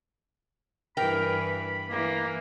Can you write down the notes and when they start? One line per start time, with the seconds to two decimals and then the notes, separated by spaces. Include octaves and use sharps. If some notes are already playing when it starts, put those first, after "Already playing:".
0.97 G2 E3 A#4 G5 B5
1.90 E3 A#3